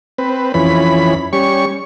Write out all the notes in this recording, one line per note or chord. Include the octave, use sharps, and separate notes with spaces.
C4 B4
F2 E3 C#4 B5
G3 C#4 C#6